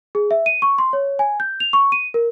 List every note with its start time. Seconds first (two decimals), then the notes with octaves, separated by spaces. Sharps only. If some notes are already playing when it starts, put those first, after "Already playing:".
0.15 G#4
0.31 E5
0.46 D#7
0.62 C#6
0.78 C6
0.93 C#5
1.19 G#5
1.40 G6
1.60 F7
1.73 C#6
1.92 D#7
2.14 A#4